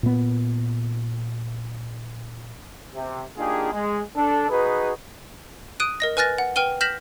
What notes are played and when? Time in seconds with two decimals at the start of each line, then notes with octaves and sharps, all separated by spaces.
0.03 A#2 B3
2.94 C3
3.37 A#3 D4 D#4 F4 G4 G#4
3.72 G#3
4.15 D4 A4
4.49 D#4 F#4 G#4 B4
5.80 D#6 F#6 D7 D#7
6.00 A#4 D#5 A#6
6.17 B4 G#5 F6 F#6 A6 A#6
6.38 F#5
6.56 B4 G5 F6 D#7 G7
6.81 F6 G6 A#6 B6 E7 F#7